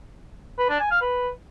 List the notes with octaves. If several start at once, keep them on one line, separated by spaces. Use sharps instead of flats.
B4
D4
G#5
F5
B4